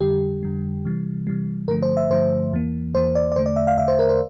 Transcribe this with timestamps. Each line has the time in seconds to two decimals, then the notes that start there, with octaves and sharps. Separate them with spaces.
0.01 F2 D3 G3 G4
0.43 F2 D3 G3
0.85 C3 E3 G3
1.27 C3 E3 G3
1.68 G2 D3 F3 A3 A#4
1.82 C5
1.97 E5
2.10 G2 D3 F3 A3 C5
2.52 E2 E3 A#3
2.94 E2 E3 A#3 C5
3.15 D5
3.32 D5
3.36 E2 D3 A3 C5
3.46 D5
3.56 E5
3.67 F5
3.77 E2 D3 A3 E5
3.88 C5
3.99 A#4
4.09 C5